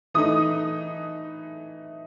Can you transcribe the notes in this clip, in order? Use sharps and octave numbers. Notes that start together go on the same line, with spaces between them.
E3 A3 D#4 D#6